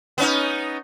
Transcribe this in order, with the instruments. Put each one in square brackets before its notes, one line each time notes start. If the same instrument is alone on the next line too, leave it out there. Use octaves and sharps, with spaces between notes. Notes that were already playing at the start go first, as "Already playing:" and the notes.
[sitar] B3 C#4 D#4